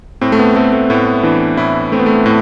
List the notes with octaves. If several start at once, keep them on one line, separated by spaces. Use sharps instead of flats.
A2 C4
A3
B3
A3 C4
A3
A2 B3
E3 D4
A2 E4
A3 C4
B3
A3
B3
A2 A3